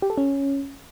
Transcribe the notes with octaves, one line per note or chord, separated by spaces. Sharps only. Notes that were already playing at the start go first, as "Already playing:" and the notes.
G4
A4
C#4